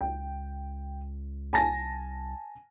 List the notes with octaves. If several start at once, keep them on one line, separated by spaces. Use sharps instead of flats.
C#2 G5
C2 G#5 A5 A#6